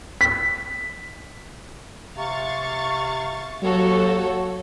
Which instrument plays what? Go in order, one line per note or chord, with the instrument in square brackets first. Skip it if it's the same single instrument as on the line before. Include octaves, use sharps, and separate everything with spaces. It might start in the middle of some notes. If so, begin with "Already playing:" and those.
[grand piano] B6
[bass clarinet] C3 [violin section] F5 C#6 A6
[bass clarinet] D#2 [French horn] F#3 [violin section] F#4 A4 C#5